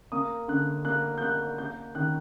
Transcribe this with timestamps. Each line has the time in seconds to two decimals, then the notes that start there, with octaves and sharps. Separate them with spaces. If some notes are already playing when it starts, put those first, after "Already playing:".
0.12 A#3 D#6
0.48 D3 F#6
0.85 A#3 F#6
1.18 G6
1.21 A#3 F#6
1.58 A#3 G6
1.95 D#3 F#6